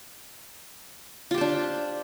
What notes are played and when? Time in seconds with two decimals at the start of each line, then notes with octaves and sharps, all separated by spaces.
1.31 F4
1.34 G4
1.38 C5
1.41 D4